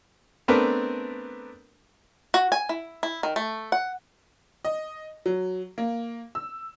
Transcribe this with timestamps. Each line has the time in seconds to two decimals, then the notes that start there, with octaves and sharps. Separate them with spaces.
0.48 A3 B3 C4 D4 A#4 B4
2.34 F#4
2.52 G#5
2.69 E4
3.03 E4
3.23 D#3
3.36 A3
3.72 F#5
4.65 D#5
5.26 F#3
5.78 A#3
6.35 E6